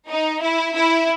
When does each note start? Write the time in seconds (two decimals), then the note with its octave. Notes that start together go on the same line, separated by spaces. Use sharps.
0.09 D#4
0.41 E4
0.74 E4